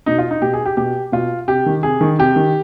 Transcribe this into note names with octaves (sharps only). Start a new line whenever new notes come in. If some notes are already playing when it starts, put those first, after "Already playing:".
B2 D#4
F4
D#4
B2 G4
G#4
G4
B2 G4
B2 F4
C3 G4
D#3
C3 G#4
D#3
C3 G4
D#3